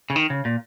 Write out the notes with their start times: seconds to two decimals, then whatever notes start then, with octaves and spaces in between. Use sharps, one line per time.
0.10 C#3
0.16 D#3
0.30 C#3
0.45 A#2